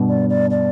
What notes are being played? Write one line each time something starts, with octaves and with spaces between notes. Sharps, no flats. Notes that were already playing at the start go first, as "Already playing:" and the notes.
Already playing: G2 B2
D5
D5
D5